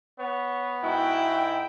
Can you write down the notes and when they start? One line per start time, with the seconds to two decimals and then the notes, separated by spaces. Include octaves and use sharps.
0.19 B3 C#5
0.83 G#2 E4 F#4 G5